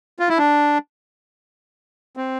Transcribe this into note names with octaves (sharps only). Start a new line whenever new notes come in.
F4
E4
D4
C4